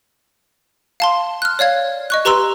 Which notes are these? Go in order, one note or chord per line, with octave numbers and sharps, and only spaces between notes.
F5 A5 C6
F6 F#6
C#5 D5 F5 G#6
D#5 C#6 F#6
G4 B4 A#5 C6 E6